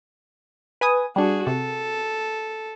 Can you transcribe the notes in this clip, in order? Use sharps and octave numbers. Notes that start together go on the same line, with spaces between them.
B4 G#5 D#6
G3 D4 F#4 G#4
C3 A4